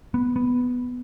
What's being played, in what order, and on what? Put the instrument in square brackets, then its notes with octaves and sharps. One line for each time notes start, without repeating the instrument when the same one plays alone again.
[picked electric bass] B3
B3